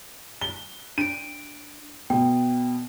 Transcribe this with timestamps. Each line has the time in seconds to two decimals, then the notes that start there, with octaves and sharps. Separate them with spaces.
0.41 G7
0.98 D4 D7 D#7
2.10 B2 G5